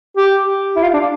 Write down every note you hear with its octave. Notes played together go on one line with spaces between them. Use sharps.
G4
E4
F4
D4